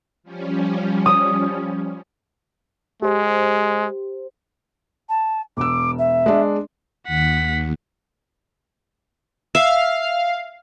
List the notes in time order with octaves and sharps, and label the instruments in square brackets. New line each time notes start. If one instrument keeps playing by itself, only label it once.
[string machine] F3 G3 C#4
[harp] D#6
[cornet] G#3 [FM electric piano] G4 C5
[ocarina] A5
[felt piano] E1 E6 [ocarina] D6
[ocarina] E5
[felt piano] G#3 D4
[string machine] D#2 [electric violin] F#5 B6
[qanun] E5 [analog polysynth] F5